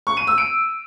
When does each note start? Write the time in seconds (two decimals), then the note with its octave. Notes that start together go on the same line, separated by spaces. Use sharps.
0.07 C#6
0.17 D#7
0.27 E6
0.38 D7